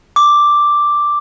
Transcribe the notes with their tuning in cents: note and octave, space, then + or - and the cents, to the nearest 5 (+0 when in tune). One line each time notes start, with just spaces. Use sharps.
D6 +0